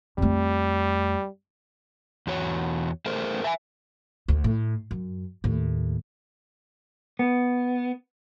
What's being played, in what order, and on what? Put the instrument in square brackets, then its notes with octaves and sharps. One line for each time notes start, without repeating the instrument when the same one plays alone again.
[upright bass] F2 A3 [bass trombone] G3
[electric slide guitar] E2 F#4 C#5
A3 G#4 A#4 C5
E5 G#5
[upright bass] D2
A2
F#2
D#2 A2
[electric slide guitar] B3